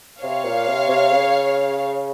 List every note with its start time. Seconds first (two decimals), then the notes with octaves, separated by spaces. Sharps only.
0.23 C3 C#5 F5
0.45 A#2
0.67 C3
0.89 C3
1.11 C#3